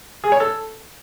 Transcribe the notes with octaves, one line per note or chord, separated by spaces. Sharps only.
G#4
C#5
A4